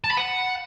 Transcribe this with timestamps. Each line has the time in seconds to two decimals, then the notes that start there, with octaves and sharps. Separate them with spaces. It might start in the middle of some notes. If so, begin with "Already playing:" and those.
0.04 A5
0.11 B5
0.17 F#5